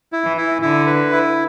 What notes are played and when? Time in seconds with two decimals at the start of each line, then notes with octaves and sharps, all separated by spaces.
0.13 E4
0.26 E3
0.37 E4
0.62 D3 E4
0.87 B4
1.12 E4